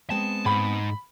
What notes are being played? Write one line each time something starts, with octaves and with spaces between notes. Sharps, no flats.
G#3 B3 C4 A5
G#2 B5